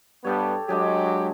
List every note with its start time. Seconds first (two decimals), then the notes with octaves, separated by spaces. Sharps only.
0.24 G2 G3 B3 G4 A4 C#5
0.69 F#3 G#3 D4 G4 G#4